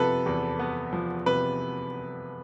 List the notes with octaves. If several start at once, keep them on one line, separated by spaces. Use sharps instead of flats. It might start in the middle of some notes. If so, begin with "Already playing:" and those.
Already playing: C3 F3 B3 A4 B4
E2
B3
F3
C3 B4